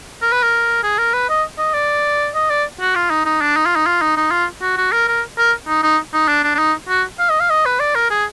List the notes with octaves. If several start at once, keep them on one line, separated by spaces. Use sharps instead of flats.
A#4
B4
A#4
G#4
A#4
B4
D#5
D#5
D5
D#5
D5
F#4
F4
D#4
D#4
D4
D#4
F4
D#4
F4
D#4
D#4
F4
F#4
F#4
A#4
A#4
A#4
D#4
D#4
D#4
D4
D4
D4
D#4
F#4
F5
D#5
F5
D#5
B4
D5
A#4
G#4